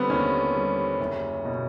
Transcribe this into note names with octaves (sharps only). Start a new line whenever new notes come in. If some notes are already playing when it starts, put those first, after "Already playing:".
Already playing: D3 G3 B3 C4
D#2 C#4
G3
F#1
B2